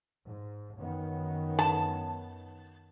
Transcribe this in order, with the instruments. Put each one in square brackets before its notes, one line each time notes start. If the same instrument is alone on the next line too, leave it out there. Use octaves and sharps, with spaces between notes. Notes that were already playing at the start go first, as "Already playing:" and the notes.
[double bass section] G#2
F#2 D#3 B3
[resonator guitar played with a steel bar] A5